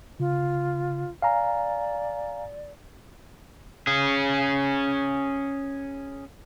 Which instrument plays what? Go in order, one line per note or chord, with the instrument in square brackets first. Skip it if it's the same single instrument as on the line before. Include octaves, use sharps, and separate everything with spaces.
[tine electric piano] C#3 [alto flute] F4
[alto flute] D5 [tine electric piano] F5 G#5 A#5
[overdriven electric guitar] C#4 G#4